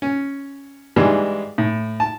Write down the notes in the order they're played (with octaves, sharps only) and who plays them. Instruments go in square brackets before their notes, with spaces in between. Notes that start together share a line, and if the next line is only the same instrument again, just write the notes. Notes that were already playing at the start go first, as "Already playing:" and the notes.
[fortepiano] C#4
G#2 E3 G3 G#3 D4
A2
A5